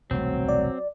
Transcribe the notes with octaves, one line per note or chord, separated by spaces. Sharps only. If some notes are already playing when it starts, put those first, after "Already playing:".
E1 C2 F#3 A3 C4
D5